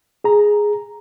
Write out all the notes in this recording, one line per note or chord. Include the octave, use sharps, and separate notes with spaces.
G#4 A#5